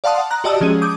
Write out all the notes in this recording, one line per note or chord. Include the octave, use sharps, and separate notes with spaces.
D5 F5 F#5 A5 C6 D#6
A#5 F#6
F#4 G4 D5 D#5 A5 E6
F3 G#3 C#4 G#4 D#7
D6 D#6 G6